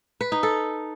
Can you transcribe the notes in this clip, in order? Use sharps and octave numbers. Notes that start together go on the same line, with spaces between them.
B4
D#4
A4